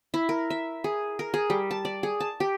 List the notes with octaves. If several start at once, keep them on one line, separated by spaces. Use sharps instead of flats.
E4
A#4
E5
G#4
A#4
G#4
G3
A5
D5
G#4
A5
G4